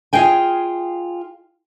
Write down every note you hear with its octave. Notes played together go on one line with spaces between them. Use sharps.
F4 G#4 D#5 G5 G#5